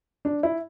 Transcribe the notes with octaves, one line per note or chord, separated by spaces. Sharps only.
D4
E4